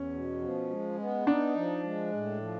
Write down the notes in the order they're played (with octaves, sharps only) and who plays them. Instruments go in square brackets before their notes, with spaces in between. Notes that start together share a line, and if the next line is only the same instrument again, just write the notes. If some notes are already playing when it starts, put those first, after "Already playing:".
Already playing: [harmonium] E2 [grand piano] C#4
[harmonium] B2
F3
G#3
B3
[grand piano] D4 [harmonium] D#4
[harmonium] F3
G#3
A2
F3